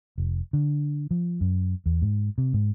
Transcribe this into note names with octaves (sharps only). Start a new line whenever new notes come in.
F1
D3
F3
F#2
E2
G#2
C3
G#2